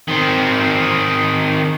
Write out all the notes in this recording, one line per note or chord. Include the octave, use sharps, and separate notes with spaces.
D#3 C4